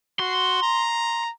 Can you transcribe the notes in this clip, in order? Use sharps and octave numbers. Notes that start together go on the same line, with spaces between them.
F#4 C6
A#5